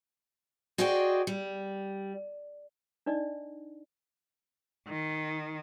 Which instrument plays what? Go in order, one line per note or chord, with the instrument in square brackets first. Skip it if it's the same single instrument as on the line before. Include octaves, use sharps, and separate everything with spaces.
[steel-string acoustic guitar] F#4 G#4 C5 D5 D#5 G5
G3
[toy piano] D4 D#4 D5 D#5
[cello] D#3